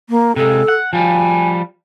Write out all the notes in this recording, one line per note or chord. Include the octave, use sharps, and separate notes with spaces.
A#3
C3 G#3 A4
F#5
F3 G3 G#5